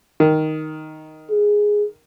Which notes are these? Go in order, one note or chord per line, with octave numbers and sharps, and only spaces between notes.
D#3
G#4